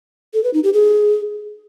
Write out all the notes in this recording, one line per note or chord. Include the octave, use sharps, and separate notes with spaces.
A4
B4
D#4
G4
G#4